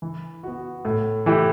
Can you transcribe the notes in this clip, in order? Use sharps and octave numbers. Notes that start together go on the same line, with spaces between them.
E3
B3 F#4
A2
E3 A3 E4 G4